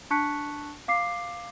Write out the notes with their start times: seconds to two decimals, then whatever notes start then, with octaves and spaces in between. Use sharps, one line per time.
0.11 D4 A5 C#6 F#6 B6 C#7
0.88 F5 D6 C7